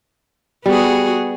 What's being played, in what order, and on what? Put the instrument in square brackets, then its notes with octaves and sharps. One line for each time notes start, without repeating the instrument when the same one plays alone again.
[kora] G3 [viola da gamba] B3 F#4 G#4